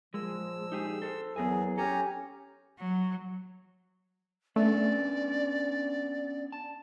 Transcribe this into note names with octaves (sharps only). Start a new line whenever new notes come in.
A#2 F3 G#3 E6
D#4 G4 G#4
A4 C5
E2 E3 F#3 B3 G#4 A#4 G#5
C#4 G4 A4 G#5 A#5
F#3
A3 B3 C#4 D4 D5
A5